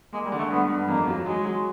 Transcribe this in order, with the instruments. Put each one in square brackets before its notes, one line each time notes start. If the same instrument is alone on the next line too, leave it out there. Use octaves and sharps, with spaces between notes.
[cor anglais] G#3 [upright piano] A#3
[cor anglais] G3
[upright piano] D3
[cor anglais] A3
[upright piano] G2 [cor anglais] B3
[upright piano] G2
[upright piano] F2 [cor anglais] A#3
[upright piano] F#3
[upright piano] F#3 [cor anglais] G#3
[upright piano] F#3